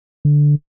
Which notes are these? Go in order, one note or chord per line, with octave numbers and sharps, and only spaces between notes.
D3